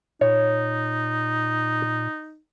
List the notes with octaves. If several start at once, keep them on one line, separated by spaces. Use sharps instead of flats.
A#2 D#4 C#5